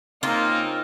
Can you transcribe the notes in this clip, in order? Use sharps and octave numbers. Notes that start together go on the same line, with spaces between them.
C#3 A#3 C4 D#4 F4